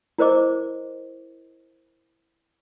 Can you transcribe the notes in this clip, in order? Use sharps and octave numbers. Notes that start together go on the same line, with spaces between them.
E4 A#4 C5 D#5 D6